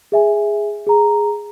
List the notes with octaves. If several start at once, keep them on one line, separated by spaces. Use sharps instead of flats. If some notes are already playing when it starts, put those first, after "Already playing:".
G#4 E5 G#5
G#4 A#5